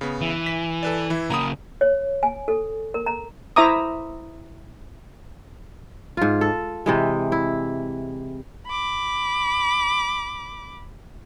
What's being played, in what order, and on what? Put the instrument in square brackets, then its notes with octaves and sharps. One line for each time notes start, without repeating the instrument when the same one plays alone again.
[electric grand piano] C#3 B3
[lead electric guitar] E3
[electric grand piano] B6
A4 B4 D5
E3 E4
[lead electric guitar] C#3 A#3 [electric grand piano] A#5 B5 D#6
[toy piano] C#5
G#5
A4
A#4
A#5
[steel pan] E4 C5 E5 A#5 D6 D#6
[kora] G#2 F4
A4
C3 E3 G#3
E4
[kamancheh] B5 D6